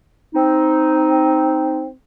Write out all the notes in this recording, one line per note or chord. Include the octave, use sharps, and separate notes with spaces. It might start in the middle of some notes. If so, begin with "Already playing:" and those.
C4 D#4